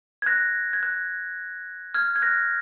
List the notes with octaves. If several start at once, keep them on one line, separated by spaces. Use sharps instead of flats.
G#6
F#6 A#6
G#6
F#6
F6 G#6
G#6
F#6 A#6